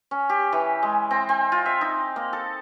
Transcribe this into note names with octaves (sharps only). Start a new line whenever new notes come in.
C#4
G4
E3
G#3
C4
C4
F4
E5
D#4
A#3
A4